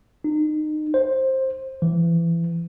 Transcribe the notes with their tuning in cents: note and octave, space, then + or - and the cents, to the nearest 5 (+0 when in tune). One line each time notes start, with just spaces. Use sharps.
D#4 -25
C5 +15
E3 +30